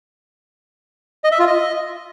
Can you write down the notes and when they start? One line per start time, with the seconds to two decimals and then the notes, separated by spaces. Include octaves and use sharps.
1.24 D#5
1.32 E5
1.39 F4
1.47 D#5